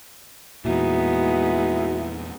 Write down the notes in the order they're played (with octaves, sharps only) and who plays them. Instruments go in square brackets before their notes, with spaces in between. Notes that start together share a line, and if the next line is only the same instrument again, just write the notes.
[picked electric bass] E2 A#2 [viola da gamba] G#3 B3 D#4 [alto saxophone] E4 [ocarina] F#4